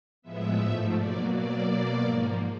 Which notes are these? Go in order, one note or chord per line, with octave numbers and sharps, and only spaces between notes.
A2 F3 G#3 B3 E5
G#2 F3 A3
B2 F#3 A#3 D5
B2 F#3 A#3 D5
B2 F#3 A#3
G#2 F3 A#3